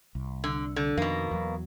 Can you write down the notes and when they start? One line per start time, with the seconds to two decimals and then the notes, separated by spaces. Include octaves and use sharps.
0.15 C2
0.44 D3
0.76 D3
0.97 F2 B2 D#3 A#3
1.31 E2 F#3